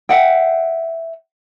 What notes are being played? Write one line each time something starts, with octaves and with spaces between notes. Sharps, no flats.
E5 F#5 G5